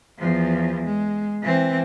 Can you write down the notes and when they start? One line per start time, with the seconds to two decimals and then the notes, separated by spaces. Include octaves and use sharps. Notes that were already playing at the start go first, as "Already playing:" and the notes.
0.18 E2 F3
0.85 G#3
1.43 E3 C4